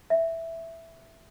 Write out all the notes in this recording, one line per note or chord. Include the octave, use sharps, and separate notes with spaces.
E5